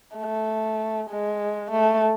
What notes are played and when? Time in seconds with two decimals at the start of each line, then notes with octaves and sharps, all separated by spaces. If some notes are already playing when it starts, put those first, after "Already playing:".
0.17 A3
1.10 G#3
1.71 A3